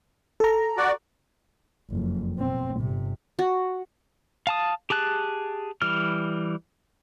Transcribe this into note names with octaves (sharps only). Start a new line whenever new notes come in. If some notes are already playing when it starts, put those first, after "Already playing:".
A4 A#5
F#4 D5
F#1 F2
B2 C4
G1 C3
F#4
F5 A5 D#6
G4 G#4 A5 F#6
E3 G3 F6